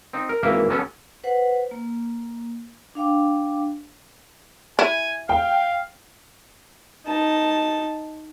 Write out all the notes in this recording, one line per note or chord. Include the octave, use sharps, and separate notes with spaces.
C4 D#4
A#4
G#1 E3 A#3 A#4 E5 F5
F#3 B3 C#4 A4
B4 C5 F#5
A#3
D4 F5 G5 D6
E4 G#5
F5 G5
D#4 A5